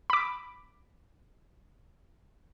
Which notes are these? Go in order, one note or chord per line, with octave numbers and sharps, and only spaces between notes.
B5 D6